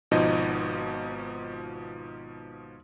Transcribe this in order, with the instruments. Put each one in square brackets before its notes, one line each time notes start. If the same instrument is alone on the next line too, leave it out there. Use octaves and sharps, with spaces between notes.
[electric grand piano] G#1 B2 F3 D#4 D#5